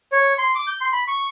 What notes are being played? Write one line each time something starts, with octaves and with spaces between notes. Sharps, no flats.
C#5
C6
D6
G6
C6
B5
C#6